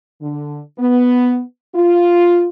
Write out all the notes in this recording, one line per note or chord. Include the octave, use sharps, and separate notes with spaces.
D3
B3
F4